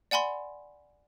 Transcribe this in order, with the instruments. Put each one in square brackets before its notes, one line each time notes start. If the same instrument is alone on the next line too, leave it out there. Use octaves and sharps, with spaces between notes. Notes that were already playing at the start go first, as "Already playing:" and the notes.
[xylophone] D5 F#5 G#5 B5 C6